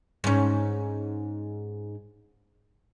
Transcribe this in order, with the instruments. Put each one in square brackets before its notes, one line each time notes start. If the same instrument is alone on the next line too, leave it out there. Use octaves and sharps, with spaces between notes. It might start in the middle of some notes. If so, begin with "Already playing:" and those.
[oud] G#2 C#4